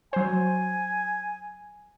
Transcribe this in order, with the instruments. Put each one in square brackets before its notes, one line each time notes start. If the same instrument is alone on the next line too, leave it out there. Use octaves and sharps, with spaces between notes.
[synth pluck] F#3 C5 [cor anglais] G#5